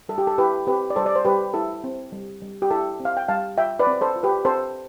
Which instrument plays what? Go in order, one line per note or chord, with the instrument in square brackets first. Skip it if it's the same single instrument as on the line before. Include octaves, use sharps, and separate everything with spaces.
[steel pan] G3 A4
G4
A4
E4 G4 B4
C4 G4 B4
D5
G3 A4 C5
D5
C5
G3 G4 B4
E4 A4
C4
G3
G3
G4
E4 A4
C4
F5
G5
G3 F5 A5
F4 E5 G5
B4 D5
C4
A4 C5
F4
G4 B4
C4 A4 C5